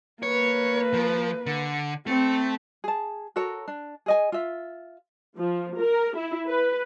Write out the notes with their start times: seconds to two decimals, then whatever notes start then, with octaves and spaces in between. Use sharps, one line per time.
0.23 A#3 B4 C#5
0.94 F3
1.46 D3
2.07 A3 C4
2.84 G#4 A5
3.36 F#4 A4 A#4 C#5
3.68 D4
4.06 G#4 D#5 G#5
4.32 F4 E5
5.36 F3
5.78 A#4
6.15 E4
6.47 B4